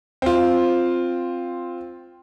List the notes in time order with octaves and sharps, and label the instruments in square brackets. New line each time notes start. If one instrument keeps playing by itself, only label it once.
[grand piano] C4 F4